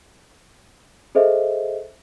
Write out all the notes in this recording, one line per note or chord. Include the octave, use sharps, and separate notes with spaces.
G#4 A4 C5 D#5 E5